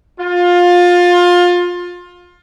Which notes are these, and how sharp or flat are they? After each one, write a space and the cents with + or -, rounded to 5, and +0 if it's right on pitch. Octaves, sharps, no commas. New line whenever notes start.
F4 +20